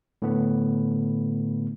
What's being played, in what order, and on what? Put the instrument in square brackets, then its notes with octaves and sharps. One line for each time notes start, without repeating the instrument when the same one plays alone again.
[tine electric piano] A2 D3 A3 B3